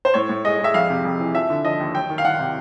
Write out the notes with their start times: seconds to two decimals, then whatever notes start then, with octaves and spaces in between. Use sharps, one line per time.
0.05 C5
0.14 A2 C#5
0.29 A2
0.44 G#3 D#5
0.59 G#3
0.64 E5
0.74 F2 F5
0.90 C3
1.05 F2
1.19 E3
1.35 F3 E5
1.50 D3
1.65 F3 D#5
1.80 D#2
1.95 F#3 G5
2.10 D#3
2.18 F5
2.24 D#3 F#5
2.39 C3